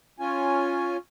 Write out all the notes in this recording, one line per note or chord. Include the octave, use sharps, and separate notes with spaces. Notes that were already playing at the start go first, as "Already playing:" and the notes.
C#4 F4 G#5